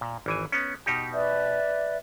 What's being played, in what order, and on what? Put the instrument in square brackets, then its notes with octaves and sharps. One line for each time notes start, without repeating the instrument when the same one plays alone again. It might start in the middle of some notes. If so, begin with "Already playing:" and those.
[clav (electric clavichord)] A#2
G#1 E3 G#5
B3 C#4
B2 D#4 G4
[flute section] B4 D5 E5